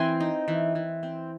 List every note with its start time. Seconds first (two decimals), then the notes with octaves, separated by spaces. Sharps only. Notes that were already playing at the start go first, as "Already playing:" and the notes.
Already playing: E3 C4 G#5 C6
0.20 D#4
0.48 E3
0.75 E3
1.03 C4